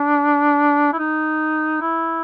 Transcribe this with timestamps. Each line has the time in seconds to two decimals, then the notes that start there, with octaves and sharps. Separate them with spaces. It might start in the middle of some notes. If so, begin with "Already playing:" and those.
Already playing: D4
0.93 E4
0.99 D#4
1.81 E4